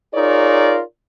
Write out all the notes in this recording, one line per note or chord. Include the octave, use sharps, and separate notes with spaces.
D#4 F4 G#4 A#4 C#5 D5